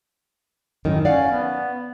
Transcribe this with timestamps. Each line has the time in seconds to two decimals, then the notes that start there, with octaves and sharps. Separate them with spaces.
0.85 F#2 A2 D#3
1.05 C#4 D5 F5 F#5
1.31 B3